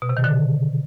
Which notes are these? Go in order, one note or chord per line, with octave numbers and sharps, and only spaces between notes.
B2
C3
D#3
D3